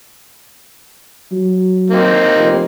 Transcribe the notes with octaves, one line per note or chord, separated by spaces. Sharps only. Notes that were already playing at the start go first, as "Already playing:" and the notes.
F#3
A#3 C4 D#4
F1